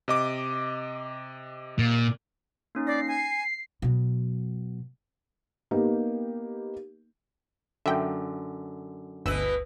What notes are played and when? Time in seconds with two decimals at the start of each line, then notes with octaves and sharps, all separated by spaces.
0.08 C3 D#5 D6
1.79 A#2
2.75 A#3 C#4 D#4
2.87 D5 A#6 C7
3.08 G#5 C7
3.82 B2 F#3
5.71 A#3 B3 D#4 G4
7.86 F#2 D3 E5 G5
9.26 G1 D2 B2 E3 B4 E6